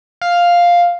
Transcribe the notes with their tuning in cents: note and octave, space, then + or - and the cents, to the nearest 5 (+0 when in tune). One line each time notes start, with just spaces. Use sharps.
F5 +0